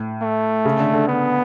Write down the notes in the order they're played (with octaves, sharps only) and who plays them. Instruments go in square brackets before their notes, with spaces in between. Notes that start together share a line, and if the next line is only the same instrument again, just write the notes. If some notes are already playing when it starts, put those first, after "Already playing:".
Already playing: [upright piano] A2
[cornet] A3
[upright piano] C#3
D3
D3
[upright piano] D3 [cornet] B3